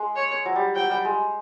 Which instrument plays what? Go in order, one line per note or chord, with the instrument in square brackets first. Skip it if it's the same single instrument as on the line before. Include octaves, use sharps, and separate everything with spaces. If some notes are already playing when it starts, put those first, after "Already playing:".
Already playing: [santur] G#3
[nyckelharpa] C#5
[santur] F#3
G3
[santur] F#3 [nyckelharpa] G5
[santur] G3
G#3